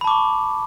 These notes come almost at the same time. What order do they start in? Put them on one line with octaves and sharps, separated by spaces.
B5 A5 D6 C#6